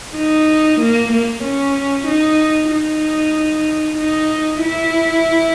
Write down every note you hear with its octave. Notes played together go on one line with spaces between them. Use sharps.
D#4
A#3
A#3
C#4
D#4
D#4
D#4
E4